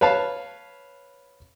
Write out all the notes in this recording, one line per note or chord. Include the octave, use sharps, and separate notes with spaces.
B4 C#5 F5 A5